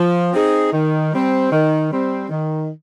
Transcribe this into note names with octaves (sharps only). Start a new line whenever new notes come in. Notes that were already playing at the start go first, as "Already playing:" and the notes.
Already playing: F3
C4 D#4 G#4
D#3
G3 C4
D#3
G3 C4
D#3